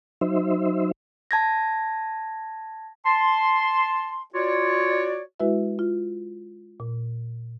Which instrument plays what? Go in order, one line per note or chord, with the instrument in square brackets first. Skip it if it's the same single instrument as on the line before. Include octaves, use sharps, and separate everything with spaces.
[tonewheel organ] F#3 D#4 C5 E5
[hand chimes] A5 G#6 A#6
[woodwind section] A5 C6
F4 F#4 C#5 D5
[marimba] G#3 E4 F#4 B4 E5
F4
A#2